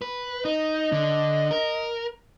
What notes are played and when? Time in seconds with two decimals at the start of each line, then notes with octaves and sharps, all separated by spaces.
0.02 B4
0.45 D#4 D#5
0.92 D3
1.51 A#4